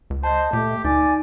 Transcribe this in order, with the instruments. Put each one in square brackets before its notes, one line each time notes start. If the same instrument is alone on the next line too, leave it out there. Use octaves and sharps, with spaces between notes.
[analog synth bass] C#2
[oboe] C5 [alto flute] D#5 [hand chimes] A5 G6
[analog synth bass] A#2 [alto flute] A3 [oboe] G4
[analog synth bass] D2 [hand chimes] D#4 [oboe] D5 [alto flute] G#5